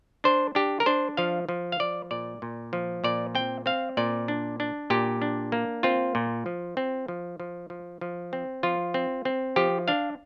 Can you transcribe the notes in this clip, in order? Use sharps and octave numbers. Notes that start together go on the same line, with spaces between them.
D4 C5
D4 G4
A#4
D4 C5
F3 F5
F3
F5
F3 D5
A#2 D5
A#2
F3
A#2 D5
C4 G5
C4 F5
A#2 D5
D4
D4
A#2 G4
D4
A#3
C4 F4
A#2
F3
C4
F3
F3
F3
F3
C4
F3 F4
C4
C4
F3 G4
D4 F5